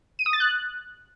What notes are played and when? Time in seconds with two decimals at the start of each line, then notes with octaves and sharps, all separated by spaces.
0.19 D#7
0.26 D#6
0.33 A6
0.40 F#6